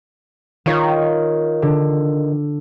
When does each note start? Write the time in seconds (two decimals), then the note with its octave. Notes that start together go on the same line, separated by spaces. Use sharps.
0.66 D#3 F4 C#5
1.62 D3